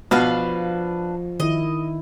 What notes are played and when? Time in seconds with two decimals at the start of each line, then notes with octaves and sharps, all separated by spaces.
0.11 B2 F3 D4 B4 F5
1.40 D#3 E4 D#5